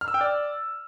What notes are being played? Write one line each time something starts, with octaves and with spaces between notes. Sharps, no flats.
F6
E6
G5
D5